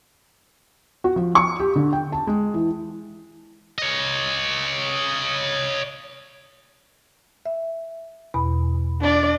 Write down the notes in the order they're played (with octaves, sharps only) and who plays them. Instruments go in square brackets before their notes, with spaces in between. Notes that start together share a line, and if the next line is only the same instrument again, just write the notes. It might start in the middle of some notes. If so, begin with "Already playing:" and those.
[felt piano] F#4
F3
C#6
G4
D3
G5
A5
G#3
E3
[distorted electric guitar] C#5 D#5
[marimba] E5
E2 B2 B5
[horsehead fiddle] D4 D5